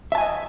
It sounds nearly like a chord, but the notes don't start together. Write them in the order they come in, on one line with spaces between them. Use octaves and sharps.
E5 A5 G#5 D#5